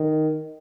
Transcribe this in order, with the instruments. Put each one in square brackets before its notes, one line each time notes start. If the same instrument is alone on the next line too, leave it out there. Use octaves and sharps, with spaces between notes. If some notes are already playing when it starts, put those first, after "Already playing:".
Already playing: [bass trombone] D#3